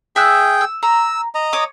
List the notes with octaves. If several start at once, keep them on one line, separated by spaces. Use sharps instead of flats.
G#4 E5 G5 E6 F#6
E6
A#5 E6
D#5 A#5
C#5 D6 D#6